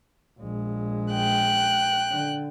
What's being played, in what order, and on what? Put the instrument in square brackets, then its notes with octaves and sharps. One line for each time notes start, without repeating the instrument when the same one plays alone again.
[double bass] A#1 G#3
[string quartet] G5 F#6
[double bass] D3